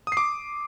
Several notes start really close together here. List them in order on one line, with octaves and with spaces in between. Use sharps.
D#6 C7 D6